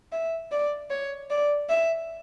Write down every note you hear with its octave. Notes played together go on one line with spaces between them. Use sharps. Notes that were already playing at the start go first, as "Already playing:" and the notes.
E5
D5
C#5
D5
E5